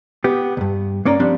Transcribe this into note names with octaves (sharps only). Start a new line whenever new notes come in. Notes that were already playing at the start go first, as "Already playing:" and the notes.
B3 G4
D2 G2
A#3 C#4 D5 A#5
F3 G3 C4 D4